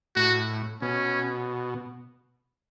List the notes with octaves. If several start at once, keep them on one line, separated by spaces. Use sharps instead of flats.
A2 F#4
B2 C#4